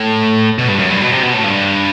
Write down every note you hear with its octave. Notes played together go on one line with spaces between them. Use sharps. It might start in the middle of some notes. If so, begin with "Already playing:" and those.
Already playing: A2
B2
G2
F#2
G2
B2
C3
B2
A2
G2